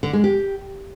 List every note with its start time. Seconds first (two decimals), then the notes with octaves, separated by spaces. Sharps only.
0.03 D3
0.13 G#3
0.24 G4